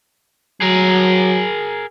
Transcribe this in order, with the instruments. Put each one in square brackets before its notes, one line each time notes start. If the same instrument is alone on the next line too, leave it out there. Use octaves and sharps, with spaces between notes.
[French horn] F#3 [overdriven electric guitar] G#4 A#4